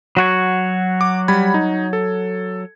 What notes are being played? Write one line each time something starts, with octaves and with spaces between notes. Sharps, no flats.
F#3 F#4 C#5
D6
G3 B5 G#6
D#4
A4